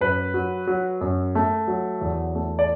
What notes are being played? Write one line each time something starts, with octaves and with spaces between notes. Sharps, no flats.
F#2 B4
F#3
F#3
F#2
A3
F#3
E2
A3
D5